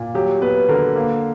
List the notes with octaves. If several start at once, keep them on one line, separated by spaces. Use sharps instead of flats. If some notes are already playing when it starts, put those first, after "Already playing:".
Already playing: A#2
F#3 G4
B3 B4
D3 A#4
A#3